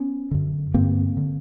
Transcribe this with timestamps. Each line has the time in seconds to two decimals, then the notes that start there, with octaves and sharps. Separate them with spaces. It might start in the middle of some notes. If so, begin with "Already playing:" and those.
Already playing: B3 C#4
0.31 F#2 D3
0.74 G2 D3 A#3 C4
1.17 D3